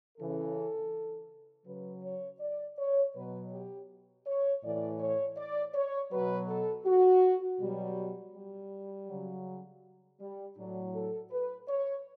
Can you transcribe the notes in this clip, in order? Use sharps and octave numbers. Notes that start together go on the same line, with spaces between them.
C#3 E3 A4
C#3 F#3 B4
C#5
D5
C#5
B2 F#3 B4
G4
C#5
A2 E3 D5
C#5
D5
C#5
B2 F#3 B4
A4
F#4
B2 F#3 G3
G3
C#3 F#3
G3
A2 F#3 D4
A4
B4
C#5